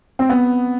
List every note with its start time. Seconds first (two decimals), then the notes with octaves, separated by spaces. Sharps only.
0.19 C4
0.30 B3